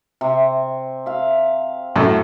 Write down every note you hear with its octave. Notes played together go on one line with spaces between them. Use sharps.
C3
E5 F5
F#2 A2 A3